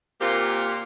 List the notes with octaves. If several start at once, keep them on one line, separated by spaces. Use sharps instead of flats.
A#2 A#3 C4 F4 G4